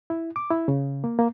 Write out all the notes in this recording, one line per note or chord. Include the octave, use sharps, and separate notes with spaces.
E4
D6
E4
C#3
A#3
A#3